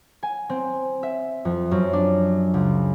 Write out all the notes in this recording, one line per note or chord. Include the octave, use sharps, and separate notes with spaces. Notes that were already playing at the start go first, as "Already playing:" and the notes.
G#5
C4
E5
F2
F#2
D4
C#2